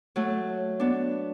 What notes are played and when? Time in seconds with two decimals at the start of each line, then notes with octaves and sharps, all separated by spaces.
0.16 F#3 A3
0.80 B3 D4